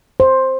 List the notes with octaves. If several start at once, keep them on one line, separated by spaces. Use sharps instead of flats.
C5